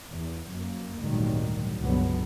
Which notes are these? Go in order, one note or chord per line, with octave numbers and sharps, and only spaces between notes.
E2
F#2 A#3
G#1 D2 A#2 D#3 F#3 G3
C#2 G2 B2 D3 F#3 B3